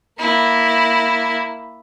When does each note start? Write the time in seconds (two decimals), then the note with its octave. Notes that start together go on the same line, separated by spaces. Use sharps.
0.19 A#3 E4